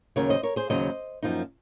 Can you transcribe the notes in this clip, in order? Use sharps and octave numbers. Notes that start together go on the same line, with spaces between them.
D#2 C#3 F#3 A#4 C#5
C5 D#5
A#4 C#5
G#4 C5
D#2 C#3 F#3 C5 D#5
F#2 F3 A#3 D#4